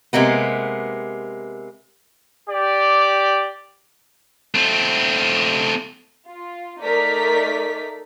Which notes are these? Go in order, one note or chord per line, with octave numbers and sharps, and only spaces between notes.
C3 G#3 A#3 B3
G4 D5
A3 C4
F4
A3 D#4 A#4 D5 B6